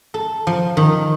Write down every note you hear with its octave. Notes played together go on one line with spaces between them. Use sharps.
A4
F3
D#3